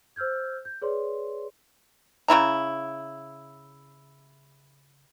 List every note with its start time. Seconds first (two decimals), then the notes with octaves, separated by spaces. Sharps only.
0.16 C5 E6 F6 G6 G#6
0.65 G6
0.82 G#4 B4 C#5 D5 C6
2.28 C#3 D#4 E4 A#5